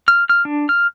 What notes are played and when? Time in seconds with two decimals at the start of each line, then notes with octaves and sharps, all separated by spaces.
0.08 F6
0.30 F6
0.45 D4
0.69 F6